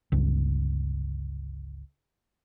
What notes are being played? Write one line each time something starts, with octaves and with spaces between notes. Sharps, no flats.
G1 C#2